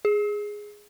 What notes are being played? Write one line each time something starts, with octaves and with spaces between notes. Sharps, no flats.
G#4